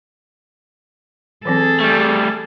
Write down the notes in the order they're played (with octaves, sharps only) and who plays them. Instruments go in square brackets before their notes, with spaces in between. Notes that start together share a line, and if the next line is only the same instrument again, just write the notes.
[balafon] E3 F#3 C4 [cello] G#4 A4
[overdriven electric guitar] G3 A3